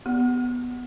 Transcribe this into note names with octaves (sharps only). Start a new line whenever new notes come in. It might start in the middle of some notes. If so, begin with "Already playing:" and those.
B3